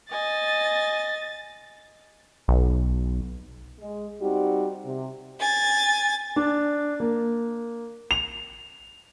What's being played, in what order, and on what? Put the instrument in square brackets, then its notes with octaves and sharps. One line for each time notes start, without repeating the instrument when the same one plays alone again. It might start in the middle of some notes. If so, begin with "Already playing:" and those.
[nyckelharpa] D#5 G#5 [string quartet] A6
[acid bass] B1
[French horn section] G#3
G3 C4 D#4 F#4 G4
C3
[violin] G#5 A6
[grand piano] D4
A#3
F7